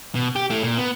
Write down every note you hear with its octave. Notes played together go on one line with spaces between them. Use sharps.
B2
G4
A3 E4
A#2
B3